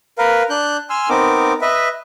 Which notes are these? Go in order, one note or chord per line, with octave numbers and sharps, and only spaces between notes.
A#4 B4 F5
D4 F#6 G6
G#5 C6 E6 F6
B3 C4 D#4 A#4 D6
B4 D#5 E5